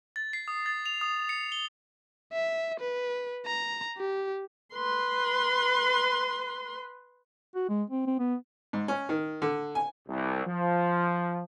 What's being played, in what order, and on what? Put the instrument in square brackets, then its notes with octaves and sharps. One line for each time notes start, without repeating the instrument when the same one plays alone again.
[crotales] A6
C7
D#6
A6
F7
D#6
C#7
G7
[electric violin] E5
B4
A#5
G4
[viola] B4 C6
[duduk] F#4
G#3
C4
C4
B3
[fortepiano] G#2
C#4
D#3
D3
G#5
[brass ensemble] C2
F3